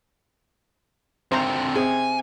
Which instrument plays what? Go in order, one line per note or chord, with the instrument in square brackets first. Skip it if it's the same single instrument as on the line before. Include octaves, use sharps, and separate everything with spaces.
[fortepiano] G#1 [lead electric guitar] D3 C4 [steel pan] C5 A#5
[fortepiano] C3 C4 [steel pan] G#4 [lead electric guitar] G#5